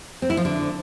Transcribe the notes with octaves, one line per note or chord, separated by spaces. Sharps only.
C4
E4
F3
D3